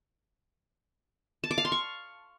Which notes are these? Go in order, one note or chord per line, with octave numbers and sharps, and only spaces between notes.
A5
D6
F5
C6
C#6